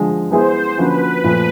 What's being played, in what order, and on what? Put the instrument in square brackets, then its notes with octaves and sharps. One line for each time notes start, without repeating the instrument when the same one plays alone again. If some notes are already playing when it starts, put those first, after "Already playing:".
Already playing: [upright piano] D3 F3 G#3
[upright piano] G#3 B3 E4 G#4 B4 [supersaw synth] C5
[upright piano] D3 F3 A#3 C#4 F#4 [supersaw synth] B4
[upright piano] A#2 F3 A3